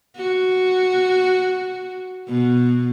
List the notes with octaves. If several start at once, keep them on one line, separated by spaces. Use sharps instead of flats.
F#4
B2